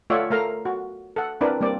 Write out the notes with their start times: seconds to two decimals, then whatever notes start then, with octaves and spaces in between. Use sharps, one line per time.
0.10 A3 F4 C#5 D5 E5 F#5
0.30 A3 A#4 F5 A#5
0.65 F#4
1.16 A4 F#5
1.41 C4 D4 E4 A#4 B4 D5
1.61 G3 A#3 C4 D5